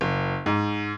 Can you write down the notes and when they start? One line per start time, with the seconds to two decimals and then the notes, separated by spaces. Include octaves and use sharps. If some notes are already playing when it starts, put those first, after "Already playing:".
0.01 F#1
0.46 G#2